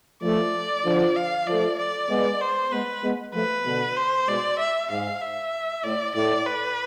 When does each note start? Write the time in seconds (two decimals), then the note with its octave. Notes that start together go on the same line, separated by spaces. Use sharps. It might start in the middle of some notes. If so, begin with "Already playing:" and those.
0.22 F3 A3 D5
0.85 D3 F3
1.16 F5
1.47 F3 A3 D5
1.78 D5
2.09 G#3 B3
2.41 C5
2.72 G#3 B3 B4
3.03 G#3 B3
3.34 F3 A3 B4
3.65 B2 D3
3.97 C5
4.28 G#2 B2 D5
4.59 E5
4.90 G#2 F5
5.21 E5
5.83 A2 D5
6.15 A2 D5
6.46 B4